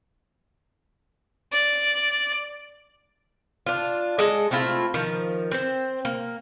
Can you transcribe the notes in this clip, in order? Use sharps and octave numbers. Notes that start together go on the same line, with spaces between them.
D5
D4 F4
G#3 G#4 A4 D#5
A3 C4 E4 F4
D#3 F3
C4 C5
A#3